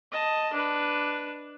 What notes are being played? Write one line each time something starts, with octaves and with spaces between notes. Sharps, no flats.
D#5 A5
D4 B4